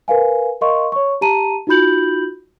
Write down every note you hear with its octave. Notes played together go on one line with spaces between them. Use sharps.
A#4 B4 F5 G#5
A#4 D#5 F5 C6 C#6
C#5 C#6
G4 A5 A#5 D#7
D#4 F4 F#4 B5 G6 F#7